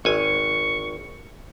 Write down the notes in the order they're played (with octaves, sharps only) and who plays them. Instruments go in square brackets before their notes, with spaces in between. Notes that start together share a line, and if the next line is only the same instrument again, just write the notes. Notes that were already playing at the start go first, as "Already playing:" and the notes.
[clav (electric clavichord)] G#1 G#5 [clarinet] C#6